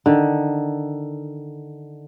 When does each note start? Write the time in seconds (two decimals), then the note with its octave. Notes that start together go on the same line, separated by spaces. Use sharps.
0.06 D3 D#3